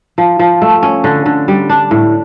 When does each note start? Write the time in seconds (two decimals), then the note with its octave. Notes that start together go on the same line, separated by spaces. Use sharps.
0.18 F3
0.39 F3
0.62 A3
0.83 C#4
1.04 D3
1.26 D3
1.48 G3
1.69 D4
1.91 A2